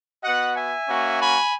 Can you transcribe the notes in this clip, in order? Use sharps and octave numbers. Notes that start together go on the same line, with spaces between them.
B3 F#4 D#5 F#5
E5 G#5
A#3 C#4 F#4
G#5 B5